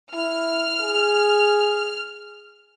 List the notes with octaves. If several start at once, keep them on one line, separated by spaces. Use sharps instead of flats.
E4 F6
G#4